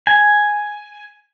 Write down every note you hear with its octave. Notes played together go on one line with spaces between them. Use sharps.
G#5